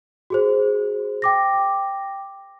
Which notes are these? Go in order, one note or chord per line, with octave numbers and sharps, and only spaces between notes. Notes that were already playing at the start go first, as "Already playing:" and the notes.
F#4 G#4 C5
G5 D6 A#6